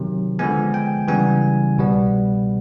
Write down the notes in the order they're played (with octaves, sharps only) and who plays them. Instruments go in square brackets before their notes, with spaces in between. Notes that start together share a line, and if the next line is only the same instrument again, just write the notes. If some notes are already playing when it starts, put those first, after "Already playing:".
Already playing: [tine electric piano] C3 D#3 F#3
D3 F3 G#3 B3 G#5
G5
C#3 E3 G3 B3 G#5
C2 B2 G3 B3